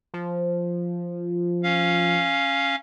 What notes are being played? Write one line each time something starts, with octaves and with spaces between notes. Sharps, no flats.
F3
C#4 F5